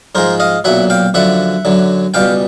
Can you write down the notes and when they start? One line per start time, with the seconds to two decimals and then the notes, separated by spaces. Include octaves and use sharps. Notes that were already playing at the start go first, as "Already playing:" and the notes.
0.15 G#2 F3 G#3 A#4 C5
0.40 D#5 F5
0.64 B1 A#2 F#3 E5 F#5
0.90 F5 G5
1.14 F#2 D3 F3 E5 F#5
1.65 F#2 D3 F#3
2.14 C#2 B2 G3 F5 G5